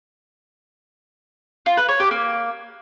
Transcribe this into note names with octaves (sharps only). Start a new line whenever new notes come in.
F4
B4
C#5
G4
A#3